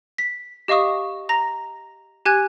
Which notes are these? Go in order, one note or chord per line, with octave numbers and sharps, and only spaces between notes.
B6
G4 D#5 F5 C#6 D#6
A#5 A#6
G4 G#5 F#6 G#6